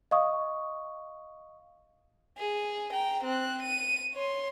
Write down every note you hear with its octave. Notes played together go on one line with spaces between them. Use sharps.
D#5 F5 C#6 D#6
G#4
G5 A#5
C4 F#6
D#7
C#5 C6